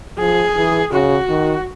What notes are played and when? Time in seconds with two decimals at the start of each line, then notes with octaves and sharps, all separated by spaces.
0.18 F3 G#4
0.55 E3
0.92 C#3 F#4
1.29 D#3